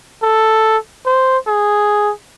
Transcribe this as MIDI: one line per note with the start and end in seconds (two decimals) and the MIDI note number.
0.23 0.77 69
1.06 1.38 72
1.47 2.12 68